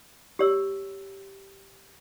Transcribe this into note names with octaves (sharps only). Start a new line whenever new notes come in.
G4 C#5 E6